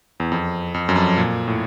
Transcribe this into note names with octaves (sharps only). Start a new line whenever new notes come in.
E2
F2
F2
F#2
F2
A#2
A2